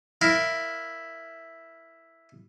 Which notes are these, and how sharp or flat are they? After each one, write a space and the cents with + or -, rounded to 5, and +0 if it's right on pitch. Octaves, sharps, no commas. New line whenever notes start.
E4 +0 A#4 +0 F5 +0